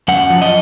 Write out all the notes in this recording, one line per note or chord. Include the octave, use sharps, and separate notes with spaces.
F#2 F#5
F3
D#5